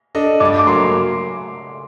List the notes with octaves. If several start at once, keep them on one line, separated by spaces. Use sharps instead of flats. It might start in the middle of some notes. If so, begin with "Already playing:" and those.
D4 A4 D#5
G2 D6
D6
F#3 A#3 C6